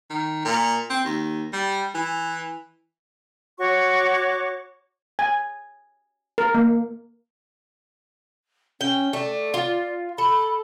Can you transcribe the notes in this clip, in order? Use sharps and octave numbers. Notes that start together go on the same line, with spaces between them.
D#3
A#2
C4
D#2
G3
E3
F#4 C#5 C#6 D6
G#5
A#4
A#3
C#4 G5
A3 D5
F4
A4 B5